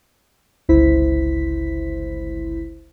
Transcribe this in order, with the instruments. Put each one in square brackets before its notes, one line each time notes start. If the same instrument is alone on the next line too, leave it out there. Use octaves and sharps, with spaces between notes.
[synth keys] G1 C#2 E4 C5 B6